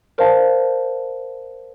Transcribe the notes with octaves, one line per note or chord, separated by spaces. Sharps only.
A#4 C5 D5 F5 A5